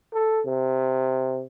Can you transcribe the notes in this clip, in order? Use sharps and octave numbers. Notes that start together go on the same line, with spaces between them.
A4
C3